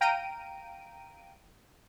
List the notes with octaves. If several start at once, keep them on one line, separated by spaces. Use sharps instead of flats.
F5 G5 A#5 D7 D#7